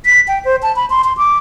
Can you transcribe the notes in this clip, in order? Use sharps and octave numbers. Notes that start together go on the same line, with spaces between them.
B6
G5
C5
A5
B5
C6
C6
D6